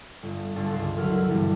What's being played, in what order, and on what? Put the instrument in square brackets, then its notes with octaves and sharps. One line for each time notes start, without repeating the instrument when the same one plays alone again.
[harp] G1
G1 D4 A4 C5
G1 C#2 C6
C#2 D3 F#3 E4 A#4 F6
E4
G2 B2 E3 G3 B3 D4